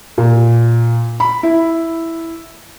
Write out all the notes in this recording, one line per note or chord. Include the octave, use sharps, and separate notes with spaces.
A#2
B5
E4